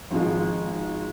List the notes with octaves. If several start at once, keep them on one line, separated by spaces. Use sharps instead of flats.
G#1 G#2 F3 G#3